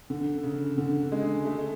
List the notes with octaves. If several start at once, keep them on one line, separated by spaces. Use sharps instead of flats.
D3
C#3
D3
G#3
A3